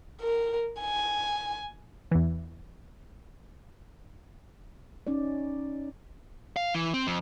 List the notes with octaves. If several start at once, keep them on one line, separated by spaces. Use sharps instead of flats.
A#4
G#5
E2 E3
C#4 D#4 D5
F5
E3
C4
F2